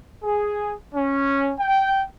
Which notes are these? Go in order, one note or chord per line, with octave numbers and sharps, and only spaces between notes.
G#4
C#4
G5